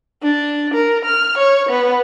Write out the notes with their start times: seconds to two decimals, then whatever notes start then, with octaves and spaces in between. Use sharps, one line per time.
0.23 D4
0.74 A#4
1.05 F6
1.38 C#5
1.69 B3